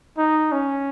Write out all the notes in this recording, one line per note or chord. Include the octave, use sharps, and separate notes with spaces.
D#4
C#4